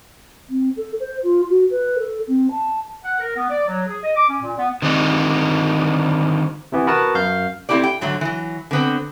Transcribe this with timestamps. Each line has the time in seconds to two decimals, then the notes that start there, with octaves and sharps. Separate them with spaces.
0.49 C4
0.77 A4
1.00 C5
1.23 F4
1.50 F#4
1.70 B4
1.98 A4
2.27 C4
2.51 A5
3.05 F#5
3.20 A#4
3.36 B3
3.50 D5
3.68 F#3
3.87 G#4
4.04 D#5
4.16 D6
4.28 C#4
4.42 A#2
4.57 B3
4.82 D3 D#3 G3 C4 D#4
6.72 C3 E3 B3
6.87 B3 F#4 A#4 B4 A5
7.15 F#2 F5 G6
7.69 A3 C4 E4 G4 D5
7.83 G5
8.01 G#2 D3 F#3 A3
8.21 E3 F#3
8.71 D3 B3 C4